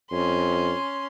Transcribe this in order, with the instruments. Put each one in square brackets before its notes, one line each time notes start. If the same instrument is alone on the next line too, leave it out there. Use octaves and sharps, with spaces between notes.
[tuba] F2 [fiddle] C#4 C6